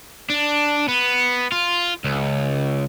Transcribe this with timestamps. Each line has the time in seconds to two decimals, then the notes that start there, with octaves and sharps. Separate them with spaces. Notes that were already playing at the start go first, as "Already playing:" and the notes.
0.30 D4
0.88 B3
1.52 F4
2.04 C#2